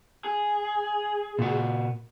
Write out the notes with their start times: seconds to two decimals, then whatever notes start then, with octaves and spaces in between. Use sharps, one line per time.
0.24 G#4
1.39 A#2 F#4